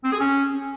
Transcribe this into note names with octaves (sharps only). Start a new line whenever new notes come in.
C4
G#4
C#4